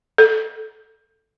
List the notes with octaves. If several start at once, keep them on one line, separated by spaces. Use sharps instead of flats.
A4